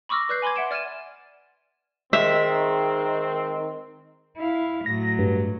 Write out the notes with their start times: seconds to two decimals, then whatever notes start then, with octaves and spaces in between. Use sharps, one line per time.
0.09 B5 C#6 D6 E6 F6 A#6
0.29 B4 D5 F#6 G6 C7
0.42 G#5 B5 C6 D6 G#6
0.56 E5 F#5 D7 E7
0.71 D5 F6 G#6 A6 D#7 E7
2.13 D#3 G#3 C4 E5
4.37 E4 F5
4.86 A2 F#3 A#6
5.19 G2